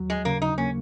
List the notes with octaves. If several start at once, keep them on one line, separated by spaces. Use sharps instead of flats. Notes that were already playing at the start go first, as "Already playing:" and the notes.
Already playing: D#2 F#3
G#3
C#3 A#3
D#4
A#3 C#4